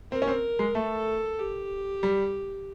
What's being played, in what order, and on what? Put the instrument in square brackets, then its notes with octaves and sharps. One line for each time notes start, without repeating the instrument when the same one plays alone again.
[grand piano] C4 [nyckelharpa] A#4
[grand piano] C#4
C4
G#3
[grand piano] A3 [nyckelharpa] A4
[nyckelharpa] G4
[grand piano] G3